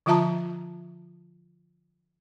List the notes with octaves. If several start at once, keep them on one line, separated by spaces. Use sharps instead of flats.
D3 F3 F4 E5 A5 A#5